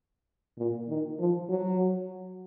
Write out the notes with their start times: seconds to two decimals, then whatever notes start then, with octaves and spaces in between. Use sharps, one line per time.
0.58 A#2
0.89 D#3
1.19 F3
1.49 F#3